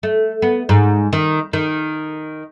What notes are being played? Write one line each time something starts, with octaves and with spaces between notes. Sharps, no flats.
A3
B3
G#2
D#3
D#3